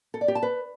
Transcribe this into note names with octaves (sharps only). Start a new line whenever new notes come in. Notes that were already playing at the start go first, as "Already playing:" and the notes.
A4
D5
G4
A5
B4